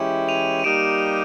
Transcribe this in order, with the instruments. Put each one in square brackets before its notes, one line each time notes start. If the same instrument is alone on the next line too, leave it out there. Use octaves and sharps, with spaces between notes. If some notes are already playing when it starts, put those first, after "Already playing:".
Already playing: [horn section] E3 G#3 C#4 E4 G4
[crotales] D#7 F7
D#7
[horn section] G3 A#3 D#4 G4 [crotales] D7 E7